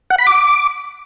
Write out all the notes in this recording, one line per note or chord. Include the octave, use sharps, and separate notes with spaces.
F#5
B5
D6